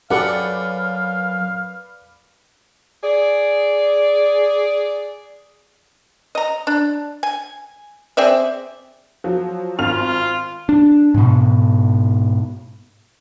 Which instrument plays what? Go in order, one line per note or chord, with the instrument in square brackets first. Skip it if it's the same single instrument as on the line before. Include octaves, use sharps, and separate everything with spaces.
[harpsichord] F#2 [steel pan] G4 A4 F#5 [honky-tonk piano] B4 D5 D6 [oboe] F5
[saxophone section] G#4 D5
[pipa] D#5 A#5
D4
G#5
C4 G#4 D5 E5
[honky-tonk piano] F3 F#3
[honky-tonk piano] G#1 F6 F7 [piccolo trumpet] F4
[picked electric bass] D4
G#2 B2